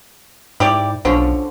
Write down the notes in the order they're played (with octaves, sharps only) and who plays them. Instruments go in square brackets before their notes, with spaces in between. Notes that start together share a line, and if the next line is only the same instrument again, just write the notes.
[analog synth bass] G#2 [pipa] E4 G4 D5
[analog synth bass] B1 [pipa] D3 F3 C#4